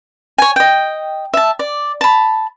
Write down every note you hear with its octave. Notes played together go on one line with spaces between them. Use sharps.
C#5 G#5
D#5 G5
E5 A5
D5
A5 B5